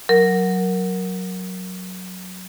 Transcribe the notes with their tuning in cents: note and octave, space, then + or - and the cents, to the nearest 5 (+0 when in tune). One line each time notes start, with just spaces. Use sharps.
F#3 +0 A#4 +0